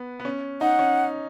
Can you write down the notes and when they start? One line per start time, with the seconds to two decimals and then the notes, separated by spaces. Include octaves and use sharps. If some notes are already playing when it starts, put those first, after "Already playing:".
Already playing: B3
0.20 B3
0.25 C#4
0.61 D#4 F#5
0.79 C#4